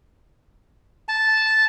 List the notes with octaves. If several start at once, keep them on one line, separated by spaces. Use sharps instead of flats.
A5